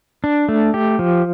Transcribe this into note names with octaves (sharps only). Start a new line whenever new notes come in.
D4
A3
G4
F3